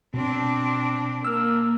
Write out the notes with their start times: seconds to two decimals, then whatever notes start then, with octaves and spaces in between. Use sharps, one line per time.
0.14 B2 C4 D4
1.25 A#3 E6 F6